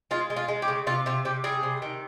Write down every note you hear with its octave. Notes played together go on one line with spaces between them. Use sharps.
G#3 F4
G#3
F4
G#3
G4
C#3
C3 F4
C3 F4
C3 G4
G3 G#4
C3
D#3